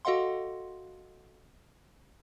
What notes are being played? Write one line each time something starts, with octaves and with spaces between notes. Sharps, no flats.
F#4 A4 D#5 F5 F#5 C6